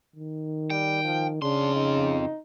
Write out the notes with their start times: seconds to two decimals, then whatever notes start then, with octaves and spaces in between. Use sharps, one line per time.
0.16 D#3
0.70 G3 G5
1.04 F3
1.42 F2 C#3 D4 C6
1.75 D#4